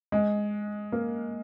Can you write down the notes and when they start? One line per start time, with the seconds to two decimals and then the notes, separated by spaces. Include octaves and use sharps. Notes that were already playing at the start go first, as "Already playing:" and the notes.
0.12 G#3
0.92 A#3